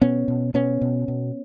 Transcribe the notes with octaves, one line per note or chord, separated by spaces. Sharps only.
B2 B3 C#4
B2
B2 B3 C#4
B2
B2